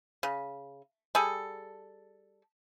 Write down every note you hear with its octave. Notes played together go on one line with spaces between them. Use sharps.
C#3
G3 G#4 A4